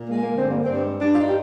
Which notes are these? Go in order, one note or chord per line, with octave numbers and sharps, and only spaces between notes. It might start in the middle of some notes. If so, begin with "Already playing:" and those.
Already playing: A#2
G#3 A#3
A#3
D3
C4
G2 A#3
G2 C4
G#3
G2 D4
F4
D#4
G4